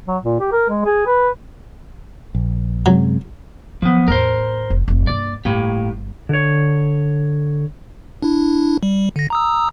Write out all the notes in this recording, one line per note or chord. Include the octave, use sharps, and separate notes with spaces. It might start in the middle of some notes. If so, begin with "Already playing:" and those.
F#3
A#2
G4
A#4
G#3
G#4
B4
A#1
F#2 C3 F#3 G#3
D#3 F3 F#3 B3
E2 A2 A#4 C5
F1
F1 C2
G2 A#3 D5
G1 A2 A#3 G4
D3 C#5
D4 E4
G3
D3 A#6
A#5 D#6 E6